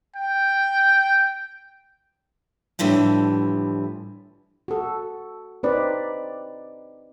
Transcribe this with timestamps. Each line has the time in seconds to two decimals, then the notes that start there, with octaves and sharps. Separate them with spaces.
0.16 G5
2.79 A2 D3 E3 F3 G3
4.68 F#4 A4
5.63 C4 D#4 B4 D5